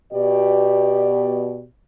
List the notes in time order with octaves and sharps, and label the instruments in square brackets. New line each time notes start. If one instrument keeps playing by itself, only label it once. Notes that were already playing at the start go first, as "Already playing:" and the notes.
[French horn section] B2 G4 D5